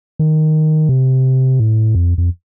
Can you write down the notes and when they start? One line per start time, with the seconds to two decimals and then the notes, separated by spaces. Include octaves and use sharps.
0.19 D#3
0.89 C3
1.59 A2
1.95 F2
2.18 F2